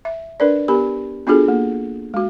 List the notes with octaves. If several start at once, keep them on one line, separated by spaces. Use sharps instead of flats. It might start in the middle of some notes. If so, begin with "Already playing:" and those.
E5
D4 A#4 B4 D5
B3 G4 A#4 B5
B3 D4 F4 F#4 G#4 A4
A#3
G#3 F#4